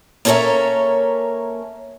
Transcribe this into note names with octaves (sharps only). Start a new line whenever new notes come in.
A#3 C#4 A4 A#4 C#5 E5